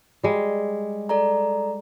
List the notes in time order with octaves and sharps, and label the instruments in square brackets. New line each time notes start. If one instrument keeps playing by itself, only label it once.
[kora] G3 G#3
[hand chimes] A4 D5 A#5